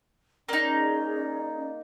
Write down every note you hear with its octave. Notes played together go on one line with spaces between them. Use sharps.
A#3 C#4 D#4 G#4 D5